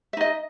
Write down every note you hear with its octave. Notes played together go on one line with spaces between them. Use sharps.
D#4 D#5 E5